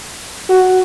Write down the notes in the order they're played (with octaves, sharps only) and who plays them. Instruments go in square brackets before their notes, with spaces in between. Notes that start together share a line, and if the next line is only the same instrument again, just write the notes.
[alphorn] F#4